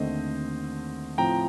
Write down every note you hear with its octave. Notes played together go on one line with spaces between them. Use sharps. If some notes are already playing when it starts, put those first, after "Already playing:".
Already playing: D#2 D3 A3 C4 C5 D#5
A2 F3 C4 G5 A#5